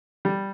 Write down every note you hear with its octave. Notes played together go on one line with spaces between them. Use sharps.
G3